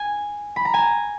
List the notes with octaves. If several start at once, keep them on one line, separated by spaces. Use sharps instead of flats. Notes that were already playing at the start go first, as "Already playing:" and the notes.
Already playing: G#5
B5
A#5
G#5